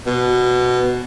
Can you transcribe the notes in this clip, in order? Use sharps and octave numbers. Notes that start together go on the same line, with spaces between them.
B2